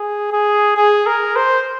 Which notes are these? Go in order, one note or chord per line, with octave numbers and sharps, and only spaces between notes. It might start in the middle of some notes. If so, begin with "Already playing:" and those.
Already playing: G#4
G#4
G#4
A#4
C5